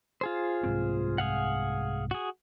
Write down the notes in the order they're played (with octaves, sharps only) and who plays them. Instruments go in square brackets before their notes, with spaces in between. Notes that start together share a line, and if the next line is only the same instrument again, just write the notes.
[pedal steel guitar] F4 G#4 C5
[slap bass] C2 G#2 C4
[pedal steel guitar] G#4 F5 F#5
F#4 G#4